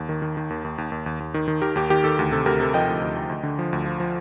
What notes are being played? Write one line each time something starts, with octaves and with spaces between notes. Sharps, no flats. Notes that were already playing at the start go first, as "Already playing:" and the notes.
Already playing: D#2
D#3
D#3
D#3
D#2
D#2
D#2
D#2
D#2
D#2
D#3
D#3
D#3 G4 A#4
D#2 G4
D#3 G4
D#3 A4
D2 G4
C3 A4
D2 G4 A#4
C3 A4
F3 D#5 G5
D2
D2
D2
D2
D3
F3
D2
F3
F3